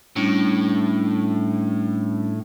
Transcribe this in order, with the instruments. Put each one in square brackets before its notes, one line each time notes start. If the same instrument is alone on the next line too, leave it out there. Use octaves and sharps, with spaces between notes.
[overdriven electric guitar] A2 [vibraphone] G3 C#4 D4